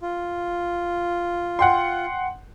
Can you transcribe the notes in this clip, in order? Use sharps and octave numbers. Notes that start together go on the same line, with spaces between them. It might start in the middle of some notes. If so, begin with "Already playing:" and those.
F4
F#5 G5 C6